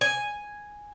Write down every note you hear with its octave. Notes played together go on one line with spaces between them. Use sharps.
G#5